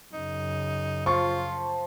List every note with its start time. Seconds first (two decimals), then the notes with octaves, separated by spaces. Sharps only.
0.13 F#2 C#3 D#4
1.06 F3 F4 C#6